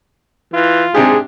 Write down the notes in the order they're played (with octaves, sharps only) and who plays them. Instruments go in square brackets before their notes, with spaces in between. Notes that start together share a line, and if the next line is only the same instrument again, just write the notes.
[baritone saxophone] E3 [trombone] F4
[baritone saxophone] G#2 [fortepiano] C3 D4 G4 [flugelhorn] G#4